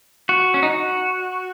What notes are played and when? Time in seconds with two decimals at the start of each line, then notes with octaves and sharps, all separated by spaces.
0.29 F#4
0.54 C#4
0.63 D#4
0.69 F#4